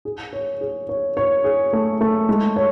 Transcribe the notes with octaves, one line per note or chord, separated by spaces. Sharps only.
G#4
C#5
G#4
C#5
C#5
G#4
A3
A3
G#3
C#5